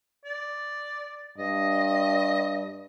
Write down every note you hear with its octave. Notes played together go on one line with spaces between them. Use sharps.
D5
G2 D#5